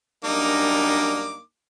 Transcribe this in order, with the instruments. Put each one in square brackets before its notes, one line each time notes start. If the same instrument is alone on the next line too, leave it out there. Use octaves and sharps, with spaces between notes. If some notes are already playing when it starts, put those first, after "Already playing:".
[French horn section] F#2 G3 D4 [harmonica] A#3 D#4 D6